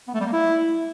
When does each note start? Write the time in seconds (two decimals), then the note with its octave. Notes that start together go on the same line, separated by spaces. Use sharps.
0.08 B3
0.14 A3
0.20 G3
0.26 A#3
0.33 E4